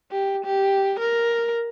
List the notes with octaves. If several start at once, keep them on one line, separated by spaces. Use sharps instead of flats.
G4
G4
A#4